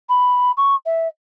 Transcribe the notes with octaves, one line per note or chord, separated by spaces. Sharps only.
B5
C#6
E5